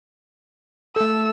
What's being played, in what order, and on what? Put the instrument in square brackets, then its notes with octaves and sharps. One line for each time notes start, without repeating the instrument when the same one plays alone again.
[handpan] A3 A4 [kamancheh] E6